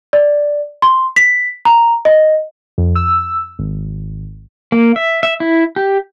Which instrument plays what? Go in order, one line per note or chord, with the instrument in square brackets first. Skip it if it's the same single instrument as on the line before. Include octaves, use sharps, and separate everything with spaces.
[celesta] D5
C6
B6
A#5
D#5
[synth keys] F2
E6
G#1
[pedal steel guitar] A#3
E5
E5
E4
G4